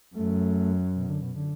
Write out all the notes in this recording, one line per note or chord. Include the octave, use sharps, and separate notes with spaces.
F#2 A3
B2
D3
B2
D3